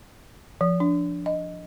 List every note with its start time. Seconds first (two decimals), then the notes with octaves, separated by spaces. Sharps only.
0.61 F3
0.80 D4
1.26 D#5